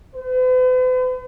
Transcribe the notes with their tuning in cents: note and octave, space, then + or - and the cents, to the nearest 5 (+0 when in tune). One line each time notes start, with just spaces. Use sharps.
B4 +45